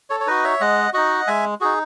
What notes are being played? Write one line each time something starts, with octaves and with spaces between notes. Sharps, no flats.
A4 C#5
C#5
D#4 F#4 B4 D#5
C#5 E5
G#3 D#5 F#5
D#4 F#4 D#5 F#5
G#3 E5 G#5
D#4 F#4 G#4